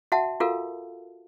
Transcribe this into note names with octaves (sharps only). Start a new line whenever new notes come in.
F#4 E5 F#5 A5
F4 F#4 A4 A#4 F5